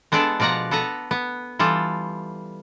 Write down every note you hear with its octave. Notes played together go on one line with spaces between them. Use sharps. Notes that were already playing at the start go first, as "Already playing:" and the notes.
G#3 B3 D4 A4 D5
B2 F3 D5 F#5 A#5
B3 A4 B4 A#5
B3
E3 G3 F4 A4